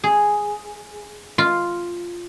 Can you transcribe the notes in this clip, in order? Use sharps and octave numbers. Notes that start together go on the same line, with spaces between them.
G#4
F4